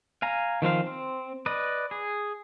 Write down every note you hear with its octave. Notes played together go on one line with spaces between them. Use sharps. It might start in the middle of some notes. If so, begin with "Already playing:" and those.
F5 G#5 A#5
D#3 F3 C4 F5
C4
B4 D5 D#5
G#4